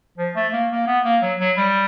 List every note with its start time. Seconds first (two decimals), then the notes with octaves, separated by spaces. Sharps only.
0.18 F3
0.35 A3
0.53 A#3
0.71 A#3
0.87 B3
1.04 A#3
1.22 F#3
1.40 F#3
1.57 G3